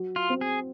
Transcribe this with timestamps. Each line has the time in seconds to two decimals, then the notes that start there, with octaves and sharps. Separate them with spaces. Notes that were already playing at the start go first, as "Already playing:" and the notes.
Already playing: F#3
0.16 F4
0.29 C4
0.41 G#4